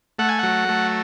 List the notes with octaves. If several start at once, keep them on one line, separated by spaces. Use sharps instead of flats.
A3 F#5
G#5
F#3 F#5
A3